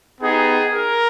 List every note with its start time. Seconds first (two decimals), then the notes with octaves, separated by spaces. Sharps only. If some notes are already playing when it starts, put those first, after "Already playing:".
0.21 B3 D#4 G4 G#4
0.72 A#4